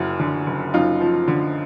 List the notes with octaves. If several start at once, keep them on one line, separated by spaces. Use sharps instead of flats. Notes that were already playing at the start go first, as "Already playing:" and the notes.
Already playing: F#1 F#2 E4 F#4
D3
F#1
F#2 D#4 F4
F3
D3